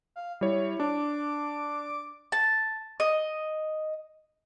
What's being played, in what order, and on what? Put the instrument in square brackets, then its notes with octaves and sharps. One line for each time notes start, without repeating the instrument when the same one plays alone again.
[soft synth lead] F5
[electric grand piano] G3 C#5 [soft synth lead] E4
[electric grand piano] D4 [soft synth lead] D6
[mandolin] A5
D#5